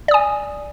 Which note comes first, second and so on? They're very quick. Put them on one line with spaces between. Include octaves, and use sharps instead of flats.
D5 D#6 G#5